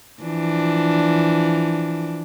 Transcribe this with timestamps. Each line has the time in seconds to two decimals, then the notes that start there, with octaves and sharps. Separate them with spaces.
0.23 E3 F3 D4